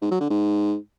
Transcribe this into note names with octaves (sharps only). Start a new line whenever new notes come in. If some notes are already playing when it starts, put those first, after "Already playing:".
G#2
F#3
D3
G#2